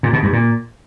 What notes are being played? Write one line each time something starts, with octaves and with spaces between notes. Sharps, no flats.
A#2
B2
G2
A#2